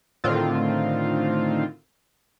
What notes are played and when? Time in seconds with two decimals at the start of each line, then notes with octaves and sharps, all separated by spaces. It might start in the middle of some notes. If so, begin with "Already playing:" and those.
0.24 A2 D3 D#3 C4 F4